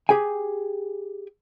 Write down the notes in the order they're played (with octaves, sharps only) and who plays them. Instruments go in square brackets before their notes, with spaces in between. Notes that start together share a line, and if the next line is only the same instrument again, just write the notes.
[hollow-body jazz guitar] G4 G#4 G5 G#5